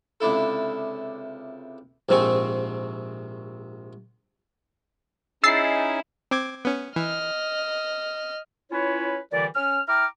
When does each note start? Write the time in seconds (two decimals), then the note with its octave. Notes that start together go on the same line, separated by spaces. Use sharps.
0.20 C#2 C3 D4 E4 A4
2.09 A#1 G#2 C3 C4 G#5 C#6
5.44 C#4 D#4 E4 G#4 E6 A6 C7
6.31 C4 D6 G#6
6.65 B3 C#4
6.96 E3 D#5 F6
8.71 C#4 E4 F4 B4 C#5
9.32 A#2 D3 E3 G3 D5
9.55 C#4 F6
9.88 E4 G5 A#5 D6 F6